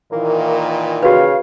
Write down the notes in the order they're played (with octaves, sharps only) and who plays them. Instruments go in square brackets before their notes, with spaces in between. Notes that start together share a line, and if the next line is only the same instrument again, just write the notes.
[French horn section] A#2 D#3 E3 [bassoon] A#3
[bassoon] C#3 [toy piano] F#4 B4 [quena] F5